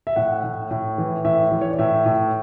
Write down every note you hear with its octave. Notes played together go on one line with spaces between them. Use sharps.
E5
A2 F#5
A2
A2
E3
A2 E5
E3
C#5
D5
A2 E5
A2